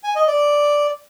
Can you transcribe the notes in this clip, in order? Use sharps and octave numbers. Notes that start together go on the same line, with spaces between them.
G#5
D#5
D5